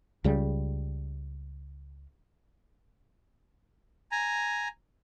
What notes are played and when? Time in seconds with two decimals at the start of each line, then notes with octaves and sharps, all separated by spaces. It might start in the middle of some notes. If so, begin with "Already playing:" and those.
0.24 C#2 C#3 G3
4.12 G#5 A#5